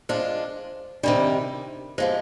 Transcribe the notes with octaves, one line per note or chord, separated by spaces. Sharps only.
G#3 D4 F4 C5
C3 D#3 G3 D4 D5
C3 F3 G#3 C5